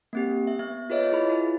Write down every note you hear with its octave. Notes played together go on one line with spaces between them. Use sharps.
A#3 C4 G4
E5
B3 E5
F4 G#4 B4 C#5 D#5 E5
E4 G#4 B5
E4 F4